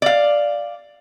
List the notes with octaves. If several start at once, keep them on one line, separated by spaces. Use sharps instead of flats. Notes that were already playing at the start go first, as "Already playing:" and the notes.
D5 F5